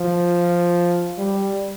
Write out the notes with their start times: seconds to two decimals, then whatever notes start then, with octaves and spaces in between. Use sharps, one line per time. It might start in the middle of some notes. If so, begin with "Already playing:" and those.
Already playing: F3
1.18 G3